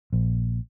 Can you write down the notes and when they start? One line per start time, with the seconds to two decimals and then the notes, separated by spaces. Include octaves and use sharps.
0.13 A#1